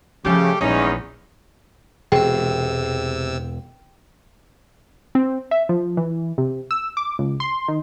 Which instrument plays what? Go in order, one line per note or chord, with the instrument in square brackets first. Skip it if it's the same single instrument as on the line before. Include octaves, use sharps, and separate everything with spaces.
[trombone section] C#3 [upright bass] F3 C#4 [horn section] G3 A3 G4
[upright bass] A#1 [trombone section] E2 G#3 [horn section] C#4 D#4
[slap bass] E1 [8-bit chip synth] C3 E6 [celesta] G#4 [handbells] G5
[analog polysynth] C4
E5
F3
E3
C3
E6
D6
C#2
C6
D#3